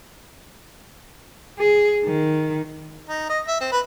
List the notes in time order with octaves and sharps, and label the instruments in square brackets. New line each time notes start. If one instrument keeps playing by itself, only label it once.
[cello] G#4
D#3
[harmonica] D#4
D#5
E5
C4
B4